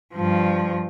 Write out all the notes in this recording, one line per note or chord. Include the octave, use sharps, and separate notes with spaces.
G2 F3